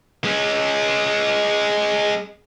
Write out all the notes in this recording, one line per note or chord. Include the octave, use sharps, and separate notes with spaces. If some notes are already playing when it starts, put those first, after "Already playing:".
G#3 C#4